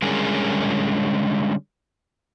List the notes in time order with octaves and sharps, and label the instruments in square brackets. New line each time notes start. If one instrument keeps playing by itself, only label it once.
[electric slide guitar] D3 G3 G#3 C#4 G#4 A#4